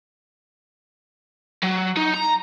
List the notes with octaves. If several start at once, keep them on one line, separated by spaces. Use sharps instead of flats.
F#3
D#4
A#5